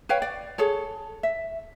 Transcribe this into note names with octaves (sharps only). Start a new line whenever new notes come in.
B4 C#5 F5 G5
D5
G#4 A4 C#5
E5